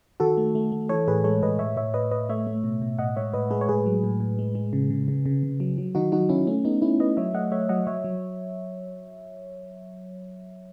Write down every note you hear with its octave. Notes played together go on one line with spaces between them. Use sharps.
D#3 F#4 A4
A3
A3
A3
E3 A4 C#5
A2 G#4 B4
G#3 A4 C#5
A2 B4 D#5
A2 C#5 E5
A2 C#5 E5
A2 B4 D#5
A2 B4 D#5
A3 C#5 E5
A3
B2
B2
A2 D#5 F#5
G#3 C#5 E5
A2 B4 D#5
G#3 G#4 B4
C#5
A2 G#4 B4
F#3
A2
A2
G#3
G#3
C#3
C#3
C#3
C#3
C#3
F#3
F#3
D#3 D#4 F#4
F#3 D#4 F#4
D#3 C#4 E4
A3 C#4
A3 B3 D#4
A3 C#4 E4
A3 B4 D#5
F#3 C#5 E5
A3 D#5 F#5
A3 C#5 E5
F#3 D#5 F#5
F#3 C#5 E5
F#3